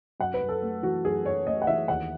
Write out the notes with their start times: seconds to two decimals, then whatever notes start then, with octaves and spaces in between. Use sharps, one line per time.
0.20 F#2 F#5
0.34 B4
0.41 F#2
0.49 A4
0.62 A3
0.83 E3 F#4
1.05 F#2 G#4
1.25 F#2 C#5
1.46 A3 D#5
1.62 F#5
1.67 E3 E5
1.88 D#2 F#5